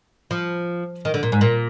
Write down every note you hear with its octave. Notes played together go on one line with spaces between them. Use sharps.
F3
D#3
D3
A#2
G#2
A#2